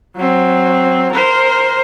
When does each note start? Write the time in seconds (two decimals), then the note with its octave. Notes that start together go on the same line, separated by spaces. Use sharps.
0.16 F#3 C4
1.12 A#4 C5